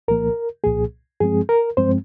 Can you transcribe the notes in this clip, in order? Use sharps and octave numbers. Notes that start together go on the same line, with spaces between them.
C2 A#2 F3 A#3 A#4
C2 A#2 F3 A#3 G#4
G2 F3 G#3 C4 G#4
A#4
G2 F3 G#3 C4 C5